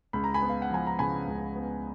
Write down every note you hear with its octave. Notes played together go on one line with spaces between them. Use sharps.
C#2 B5
A#5
G#5 B5
B3
F5
F#5
F3 G#5
A#5
C#3 G#5 B5
C#2
B3